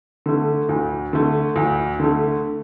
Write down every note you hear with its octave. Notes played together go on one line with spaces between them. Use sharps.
D3 A3
D2
D3 A3
D2
D3 A3